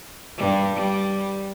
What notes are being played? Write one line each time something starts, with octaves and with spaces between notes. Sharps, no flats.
G2 G3
G3